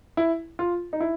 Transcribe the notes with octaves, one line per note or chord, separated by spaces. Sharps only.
E4
F4
D#4
E4